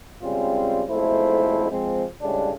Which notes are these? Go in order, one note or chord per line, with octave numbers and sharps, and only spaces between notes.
C#3 G3 G#3 C4 C#4 F4
B1 F2 G#3 A3 E4 C5
F3 G#3 C4
A2 C#3 G3 G#3 D4